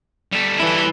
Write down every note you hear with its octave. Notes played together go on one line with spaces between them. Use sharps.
G3 A4
E3 E4